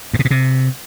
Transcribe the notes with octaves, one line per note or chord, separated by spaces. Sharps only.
G2
B2
A#2
C3